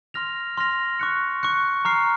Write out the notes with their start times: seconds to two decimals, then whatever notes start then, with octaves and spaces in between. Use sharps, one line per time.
0.14 C6 F6 A#6 F7
0.57 C6 F6 A#6 F7
0.99 C#6 F#6 C#7
1.43 C#6 F#6 C#7
1.85 A#5 C#6 F6 C7